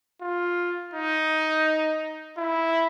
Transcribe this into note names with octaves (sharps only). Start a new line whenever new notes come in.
F4
D#4
E4